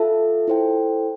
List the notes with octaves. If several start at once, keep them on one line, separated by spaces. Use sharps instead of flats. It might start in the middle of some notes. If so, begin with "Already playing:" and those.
Already playing: F4 A4 E5 A5
E4 A4 C5 G5